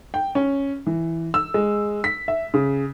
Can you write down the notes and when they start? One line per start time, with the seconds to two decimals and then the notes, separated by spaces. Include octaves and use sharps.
0.14 G5
0.35 C#4
0.86 E3
1.34 E6
1.54 G#3
2.04 B6
2.28 E5
2.54 C#3